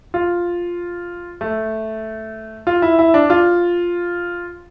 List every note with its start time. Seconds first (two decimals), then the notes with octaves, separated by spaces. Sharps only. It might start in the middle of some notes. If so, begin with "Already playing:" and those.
0.14 F4
1.41 A3
2.67 F4
2.82 E4
2.99 E4
3.14 D4
3.30 F4